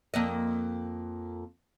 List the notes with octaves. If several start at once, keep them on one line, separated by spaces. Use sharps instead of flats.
F2 A#3 D#5